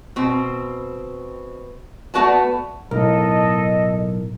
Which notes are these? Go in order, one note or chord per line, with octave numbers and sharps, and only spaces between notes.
B2 C4
A3 B3 F#4 B4 D5 A5
B1 A2 A4 A#4 D#5